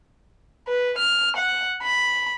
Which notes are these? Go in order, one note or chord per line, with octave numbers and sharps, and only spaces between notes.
B4
F6
F#5
B5